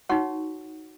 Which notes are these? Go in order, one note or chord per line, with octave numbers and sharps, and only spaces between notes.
D#4 F#4 C#5 F#5 C#6